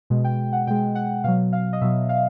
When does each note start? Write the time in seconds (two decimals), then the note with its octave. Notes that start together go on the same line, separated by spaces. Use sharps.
0.10 B2 G#3
0.24 G5
0.53 F#5
0.67 B2 G#3 G5
0.95 F#5
1.24 B2 F#3 F5
1.53 F5
1.73 D#5
1.81 B2 F#3 E5
2.09 F5